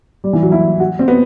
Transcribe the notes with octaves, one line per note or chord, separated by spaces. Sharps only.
G3
E3
F#3
E4
F#4
C4
B3